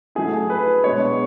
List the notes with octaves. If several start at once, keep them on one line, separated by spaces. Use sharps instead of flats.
F#3 A3 E4 G#4
B4
B2 G#3 B3 D4 C#5